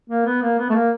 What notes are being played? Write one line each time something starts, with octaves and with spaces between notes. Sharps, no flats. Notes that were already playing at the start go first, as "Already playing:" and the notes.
A#3
B3
A#3
B3
A3
A#3